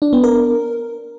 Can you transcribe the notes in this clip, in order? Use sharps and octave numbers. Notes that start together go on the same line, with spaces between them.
D4
B3
A#4